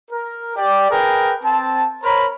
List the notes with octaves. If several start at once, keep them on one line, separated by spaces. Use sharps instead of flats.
A#4
G4 D5
G#4 A#4 B4 G5
C4 A5
A#4 C5 C#5 A#5 B5